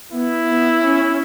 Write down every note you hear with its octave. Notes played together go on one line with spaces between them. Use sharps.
B3 E4
B3
C#4